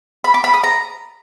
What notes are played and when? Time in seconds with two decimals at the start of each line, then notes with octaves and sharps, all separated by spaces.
0.24 B5
0.34 D6
0.44 B5
0.54 D#6
0.63 A#5